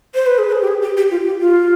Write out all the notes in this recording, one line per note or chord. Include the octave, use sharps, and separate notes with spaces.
C5
B4
G#4
B4
G#4
G4
G#4
G4
G4
F4
G4
F4